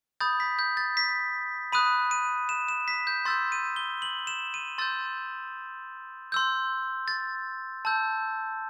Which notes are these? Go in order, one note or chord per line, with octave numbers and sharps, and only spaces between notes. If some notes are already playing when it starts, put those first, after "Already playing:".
B5 D#6 G6 A6
B6
G6
A6
B6
B5 D#6 F#6 D#7
D#7
E7
E7
B6
G6
C6 E6 G6 A6
D#7
G7
F#7
E7
D#7
C6 E6 G6 A6
C6 E6 G6
A6
A5 E6 G6